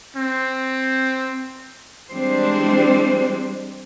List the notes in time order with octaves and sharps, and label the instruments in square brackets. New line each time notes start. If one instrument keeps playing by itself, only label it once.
[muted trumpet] C4
[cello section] E3 G3 G#3 C4 D4 C5